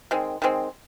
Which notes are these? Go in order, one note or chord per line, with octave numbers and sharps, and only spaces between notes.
D#3 G#3 C4
D#3 G#3 C4